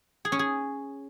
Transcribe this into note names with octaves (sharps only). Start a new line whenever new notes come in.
G#4
C#4
G#4